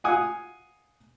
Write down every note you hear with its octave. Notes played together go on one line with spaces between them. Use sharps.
F5 F#5 G#5 D#6